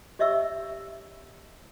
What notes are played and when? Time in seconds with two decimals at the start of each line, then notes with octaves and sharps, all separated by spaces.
0.19 G4 C#5 D#5 E5 C#6 E6